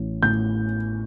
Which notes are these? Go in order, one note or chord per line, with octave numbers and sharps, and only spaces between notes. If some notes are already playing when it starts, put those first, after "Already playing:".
Already playing: A1 C#4
A2 G6